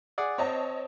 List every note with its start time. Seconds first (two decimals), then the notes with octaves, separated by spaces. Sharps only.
0.18 G#4 D5 F#5
0.38 C4 C#5 D#5 A5